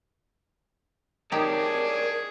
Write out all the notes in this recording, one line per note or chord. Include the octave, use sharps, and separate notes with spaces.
D#4 G4 G#4 A#4 C#5 D5 A5